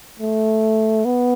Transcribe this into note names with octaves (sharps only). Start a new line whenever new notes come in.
A3
B3